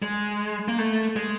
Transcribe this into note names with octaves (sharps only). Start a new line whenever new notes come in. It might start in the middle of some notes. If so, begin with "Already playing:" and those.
G#3
A#3
A3
G#3